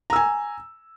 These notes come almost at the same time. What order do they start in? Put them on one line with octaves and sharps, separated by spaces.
A#5 E6 G#5